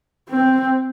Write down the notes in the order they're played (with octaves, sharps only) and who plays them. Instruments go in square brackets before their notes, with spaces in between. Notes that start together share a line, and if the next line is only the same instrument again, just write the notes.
[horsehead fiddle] C4